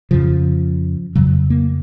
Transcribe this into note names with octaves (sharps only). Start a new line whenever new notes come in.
F2 C#3 F3
F2 C#3 F#3
A#3